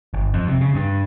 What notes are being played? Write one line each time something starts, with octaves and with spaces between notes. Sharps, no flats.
G1
F2
C3
C#3
G2